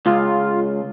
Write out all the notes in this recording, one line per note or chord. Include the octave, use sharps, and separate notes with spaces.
C#2 F4